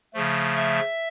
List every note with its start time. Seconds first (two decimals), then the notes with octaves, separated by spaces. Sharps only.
0.14 C#3 F3 A3
0.55 E5